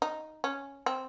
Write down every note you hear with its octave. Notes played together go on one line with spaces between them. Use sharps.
D#4
C#4
C4